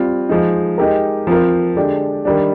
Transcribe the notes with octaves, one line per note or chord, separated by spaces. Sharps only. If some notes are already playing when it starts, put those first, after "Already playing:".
Already playing: G3 C4 F4
F3 G#3 D#4
G#3 D#4 G4 A#4
F3 C4 F4 A#4
D3 G#3 D4 G4
D#3 G3 D4